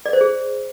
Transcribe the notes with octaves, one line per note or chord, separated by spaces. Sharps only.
D5
C5
G#4